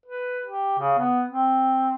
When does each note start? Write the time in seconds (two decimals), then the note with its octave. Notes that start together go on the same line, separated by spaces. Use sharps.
0.06 B4
0.46 G4
0.79 C#3
0.99 B3
1.29 C4